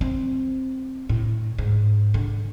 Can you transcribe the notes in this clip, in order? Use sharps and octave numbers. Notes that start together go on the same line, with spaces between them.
C4
A2
G#2
D3